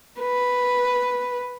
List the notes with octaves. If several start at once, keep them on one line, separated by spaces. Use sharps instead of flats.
B4